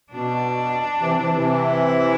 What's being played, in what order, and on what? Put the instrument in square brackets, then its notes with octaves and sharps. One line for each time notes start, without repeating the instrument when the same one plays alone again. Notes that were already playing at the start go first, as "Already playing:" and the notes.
[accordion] B2 [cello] D4
[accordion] C3 E3
C3 E3
C3 E3
[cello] E4